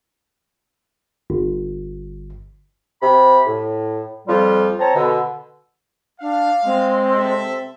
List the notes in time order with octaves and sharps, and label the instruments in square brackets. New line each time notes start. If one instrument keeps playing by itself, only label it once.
[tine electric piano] G1
[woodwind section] C3 B5
A2
F2 F3 G3 F4
C4 C#5 A5 A#5
B2 D3
[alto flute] D4 [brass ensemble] F5
[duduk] G#3 [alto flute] C4
[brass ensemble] C3 A4 E5